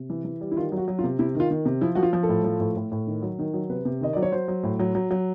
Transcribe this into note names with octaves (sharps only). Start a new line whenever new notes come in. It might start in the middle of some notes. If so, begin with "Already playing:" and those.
Already playing: C3
E3
E3
G3
E4
D#3 F4
F#3
F#4
F#3
F4
C3
C3 E4
D#3 F4
D#3
C3
F3 E4
F3 F#4
F4
F3
A4
A2
F3
A2
A2
A2
D#3
F#3
D#3
F#3
C3 B4
C3
D#3 D#5
F#3 D5
C#5
F#3 C5
F#3
A2
F#3
F#3
F#3